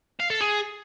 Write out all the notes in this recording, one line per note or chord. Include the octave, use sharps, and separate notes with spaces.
F5
A4
G#4